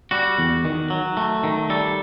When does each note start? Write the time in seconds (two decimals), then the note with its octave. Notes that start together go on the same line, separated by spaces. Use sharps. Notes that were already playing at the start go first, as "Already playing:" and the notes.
0.11 G3 F#4
0.38 E2
0.65 D#3
0.90 F#3
1.17 A3
1.44 D#3
1.70 G3 A4